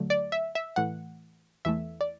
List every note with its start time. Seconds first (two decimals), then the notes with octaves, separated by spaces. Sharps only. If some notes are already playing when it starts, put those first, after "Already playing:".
Already playing: D2 D3 F#3 A3
0.10 D5
0.32 E5
0.55 E5
0.76 A2 E3 A3 F#5
1.65 E2 E3 A3 E5
2.01 D5